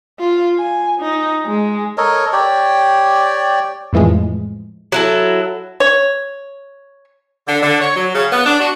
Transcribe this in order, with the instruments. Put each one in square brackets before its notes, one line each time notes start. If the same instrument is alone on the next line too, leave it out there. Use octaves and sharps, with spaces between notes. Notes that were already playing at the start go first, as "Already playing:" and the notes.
[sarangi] F4
G#5
D#4
G#3
[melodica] A4 A#4 C#5 D#5
G4 C#5 D5 G5
[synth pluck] F2 A2 E3 F3 G#3
[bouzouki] F#3 E4 A4
[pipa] C#5
[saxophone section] D3
D3
C#5
F#3
C#3
B3
D4
F#4